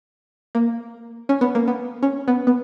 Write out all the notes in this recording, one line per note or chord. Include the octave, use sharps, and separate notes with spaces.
A#3
C#4
B3
A#3
B3
C#4
B3
B3